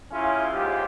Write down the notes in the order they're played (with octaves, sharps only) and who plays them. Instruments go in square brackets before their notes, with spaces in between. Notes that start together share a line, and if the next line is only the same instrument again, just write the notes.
[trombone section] F#2 C#3 C#4 E4 F4
D#2 G#2 F4 G4